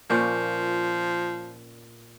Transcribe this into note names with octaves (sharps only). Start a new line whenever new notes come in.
A#2 F3 C#4 C5